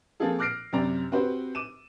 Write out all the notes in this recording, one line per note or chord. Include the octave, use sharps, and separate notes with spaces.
F3 A#3 C4 F4 G#4 A4
D6 F6 F#6 A#6 C7 D7
F#2 C3 C4 G4 D5 A#5
C4 F#4 G4 B4 C5
D6 D#7 E7